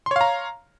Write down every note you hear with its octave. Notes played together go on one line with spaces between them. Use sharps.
C#5 F5 A#5 C6